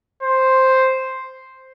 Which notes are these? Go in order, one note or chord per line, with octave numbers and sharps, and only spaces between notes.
C5